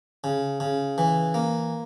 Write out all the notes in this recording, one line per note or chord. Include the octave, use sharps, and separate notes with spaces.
C#3
C#3
E3
A#3